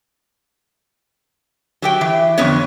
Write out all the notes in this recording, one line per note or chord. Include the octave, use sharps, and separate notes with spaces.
F#3 G4 G5
E3
F2 D3 B3 C#5